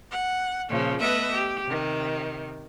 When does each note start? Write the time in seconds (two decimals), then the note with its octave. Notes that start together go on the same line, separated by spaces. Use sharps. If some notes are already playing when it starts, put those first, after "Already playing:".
0.11 F#5
0.69 A#2 C#3 F3
1.00 A3 B3 B4 D#5 E5
1.32 G4
1.64 C3 D#3